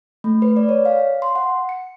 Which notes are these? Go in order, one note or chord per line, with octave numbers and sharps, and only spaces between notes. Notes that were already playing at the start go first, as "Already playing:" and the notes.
A3
B4
D5
C#5
F5
C6
F#5
C#7